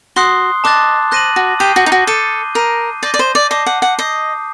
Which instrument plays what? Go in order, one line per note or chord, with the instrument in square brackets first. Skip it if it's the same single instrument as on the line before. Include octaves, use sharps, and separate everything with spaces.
[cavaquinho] F#4 [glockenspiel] C6 D#6 F#6 C7 G7
[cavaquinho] D#5 [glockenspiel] A5 D6 F#6 A6
[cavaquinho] C5 [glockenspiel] F#6 A#6 D#7 F#7
[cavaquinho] F#4
[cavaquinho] G4 [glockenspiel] D#6 G6 C7 D#7 G7
[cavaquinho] F#4
D#4
F#4
[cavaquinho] A4 [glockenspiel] D6 G6 C7 D#7 G7
[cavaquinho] A#4 [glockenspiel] G6 C7 D#7
[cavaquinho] D5 [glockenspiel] G6 A#6 D#7 G7
[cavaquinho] D5
C5
D5
[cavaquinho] D#5 [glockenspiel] A5 D6 G6 C7 G7
[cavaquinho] F#5
F#5
[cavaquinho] D#5 [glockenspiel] D#6 G6 C7